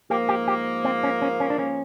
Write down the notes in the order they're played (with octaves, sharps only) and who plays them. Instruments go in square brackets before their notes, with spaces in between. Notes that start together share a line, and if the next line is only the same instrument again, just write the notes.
[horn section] G#2 F3 A#3 [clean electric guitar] G4
[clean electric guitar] G4
G4
C4
C#4
C#4
C#4
D4
C#4